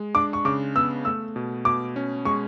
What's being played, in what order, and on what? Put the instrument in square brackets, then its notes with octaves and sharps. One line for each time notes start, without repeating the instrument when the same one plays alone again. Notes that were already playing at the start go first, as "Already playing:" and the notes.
Already playing: [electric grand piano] G#3
[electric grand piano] D4 [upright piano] D6
[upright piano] C#6
[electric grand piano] C#3 [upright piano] D6
[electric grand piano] B3 [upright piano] E6
[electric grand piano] A3 [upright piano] E6
[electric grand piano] B2
[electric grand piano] B2 [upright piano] D6
[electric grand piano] C#4
[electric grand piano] G#3 [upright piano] C#6